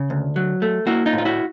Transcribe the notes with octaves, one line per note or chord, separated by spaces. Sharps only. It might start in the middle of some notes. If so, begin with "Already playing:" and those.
Already playing: C#3
D2
F#3
A3
A#3 E4 F#4
D#4 F4
A2
F4
E4 F#4